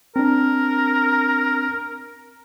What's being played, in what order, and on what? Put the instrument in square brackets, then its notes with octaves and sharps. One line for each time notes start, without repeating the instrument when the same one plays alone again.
[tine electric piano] C4 D4 [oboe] A#4